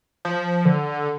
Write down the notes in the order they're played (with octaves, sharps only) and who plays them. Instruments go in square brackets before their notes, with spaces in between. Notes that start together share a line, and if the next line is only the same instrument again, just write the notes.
[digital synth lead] F3
D3